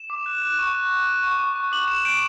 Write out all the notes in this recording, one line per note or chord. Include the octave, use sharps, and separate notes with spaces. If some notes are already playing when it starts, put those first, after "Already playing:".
Already playing: E7
D6
F#6
F#6
C#6
F#6
F#6
F#6
C#6
C#6
C#6
D6 F#7
D6 E7
G6 D7